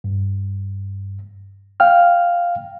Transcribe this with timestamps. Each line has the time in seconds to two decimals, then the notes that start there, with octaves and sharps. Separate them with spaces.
0.04 G2
1.80 F5 G5 F6